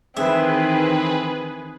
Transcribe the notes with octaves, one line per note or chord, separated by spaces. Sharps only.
D#3 E3 C4 G#4 B4 E5